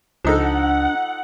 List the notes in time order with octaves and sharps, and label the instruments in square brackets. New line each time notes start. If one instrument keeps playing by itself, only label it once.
[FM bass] C#2 [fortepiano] F3 D#4 A4 [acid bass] D4 [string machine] F#5